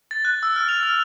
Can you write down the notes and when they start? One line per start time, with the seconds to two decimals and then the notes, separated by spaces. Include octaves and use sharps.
0.11 A6
0.25 F#6
0.43 E6
0.56 F6
0.69 F7
0.83 F6